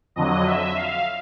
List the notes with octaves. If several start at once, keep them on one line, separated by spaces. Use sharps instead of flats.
F2 D3 F#3 D#5
E5
F5